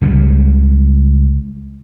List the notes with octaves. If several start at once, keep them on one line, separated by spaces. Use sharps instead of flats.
C#2 C#3 F3 G3